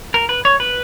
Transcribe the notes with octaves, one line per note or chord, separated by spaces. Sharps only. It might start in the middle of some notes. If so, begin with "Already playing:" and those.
A#4
B4
C#5
B4